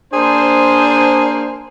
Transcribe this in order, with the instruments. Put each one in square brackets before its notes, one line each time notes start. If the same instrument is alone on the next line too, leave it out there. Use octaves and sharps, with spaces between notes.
[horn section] A#3 D4 G#4 C5